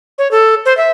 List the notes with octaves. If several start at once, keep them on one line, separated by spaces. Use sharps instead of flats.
C#5
A4
C5
E5